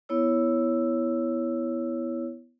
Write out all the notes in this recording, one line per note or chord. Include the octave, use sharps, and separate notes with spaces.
B3 E4 C#5 E6